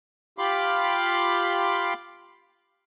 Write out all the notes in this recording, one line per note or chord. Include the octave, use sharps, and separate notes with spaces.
F4 G4 F5 B5 C6 D6